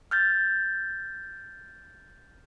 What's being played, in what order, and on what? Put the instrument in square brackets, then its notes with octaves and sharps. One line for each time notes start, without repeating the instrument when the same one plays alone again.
[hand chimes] F6 G6 A6